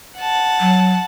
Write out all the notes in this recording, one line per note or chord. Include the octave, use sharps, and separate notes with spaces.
F#5 A5
F#3